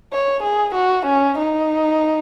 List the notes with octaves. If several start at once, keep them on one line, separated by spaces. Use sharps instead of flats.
C#5
G#4
F#4
C#4
D#4